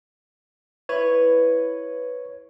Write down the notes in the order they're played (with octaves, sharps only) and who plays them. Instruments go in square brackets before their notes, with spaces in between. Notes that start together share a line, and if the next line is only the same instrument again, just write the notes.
[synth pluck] E4 B4 [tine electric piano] C#5